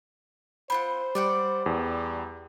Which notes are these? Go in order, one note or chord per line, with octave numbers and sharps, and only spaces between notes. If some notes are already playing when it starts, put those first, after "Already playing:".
C4 F4 C5 F#5 B5
G3 D5 F#5 G5
E2 G3